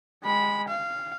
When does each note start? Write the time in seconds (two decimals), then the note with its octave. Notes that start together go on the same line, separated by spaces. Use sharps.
0.24 G#3 B5
0.68 F5